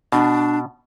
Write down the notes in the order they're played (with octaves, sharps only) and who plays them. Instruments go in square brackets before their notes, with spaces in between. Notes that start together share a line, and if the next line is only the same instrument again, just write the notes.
[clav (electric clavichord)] B2 [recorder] D4